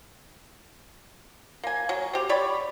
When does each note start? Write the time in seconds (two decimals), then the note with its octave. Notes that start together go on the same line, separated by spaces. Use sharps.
1.64 A#3 G#5
1.89 F#3
2.13 C4 G4
2.29 G3 C#5 D5 B5